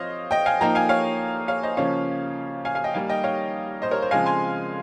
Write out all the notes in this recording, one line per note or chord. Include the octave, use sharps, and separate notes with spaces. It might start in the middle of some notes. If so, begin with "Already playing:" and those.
Already playing: F3 C4 C5 C#5 D#5 F5
D#5 G5
F5 G#5
F3 A#3 D#4 G5 A#5
F5 G#5
C#5 F5
C#5 F5
C5 D#5
C#3 F3 A#3 C#4 C#5 F5
F5 G#5
F5 G#5
D#5 G5
D#3 G3 A#3 D#4 F5 G#5
D#5 G5
C#5 F5
C5 D#5
A#4 C#5
C5
C#3 F3 G#3 C4 F5 G#5
G#5 C6